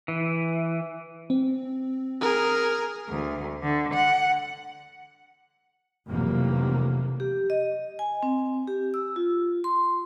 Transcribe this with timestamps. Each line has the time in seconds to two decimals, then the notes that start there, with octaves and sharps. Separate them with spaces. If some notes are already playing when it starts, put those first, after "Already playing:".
0.08 E3
1.30 C4
2.21 G#4 A#4
3.09 D2
3.63 D3
3.94 F#5
6.08 F1 F2 C3 E3 F#3 A#3
7.20 G4
7.50 D#5
7.99 G#5
8.23 C4
8.68 G4
8.94 E6
9.16 F4
9.64 C6